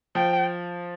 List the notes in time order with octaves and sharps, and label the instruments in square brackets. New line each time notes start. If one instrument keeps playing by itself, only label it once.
[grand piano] F3 [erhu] G5